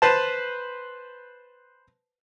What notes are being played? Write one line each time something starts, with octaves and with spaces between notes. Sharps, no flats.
B4 C5 A5